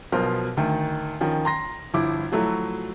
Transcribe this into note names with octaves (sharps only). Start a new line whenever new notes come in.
B1 B2 F3 A#4 C5 C6
D2 D#3
D#3 F3 C#4
A#5 C6 A#6
G1 F3 E4 D6
F3 F#3 A3 E4 F#4